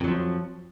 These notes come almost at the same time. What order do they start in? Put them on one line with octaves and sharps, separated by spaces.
F2 F#3 F3